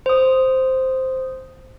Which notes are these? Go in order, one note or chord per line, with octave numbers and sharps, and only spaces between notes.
C5 D#6